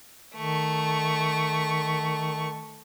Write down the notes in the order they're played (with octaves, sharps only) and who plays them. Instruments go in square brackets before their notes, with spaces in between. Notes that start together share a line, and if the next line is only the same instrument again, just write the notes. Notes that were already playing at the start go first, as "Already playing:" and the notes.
[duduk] D#3 [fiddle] A3 C#6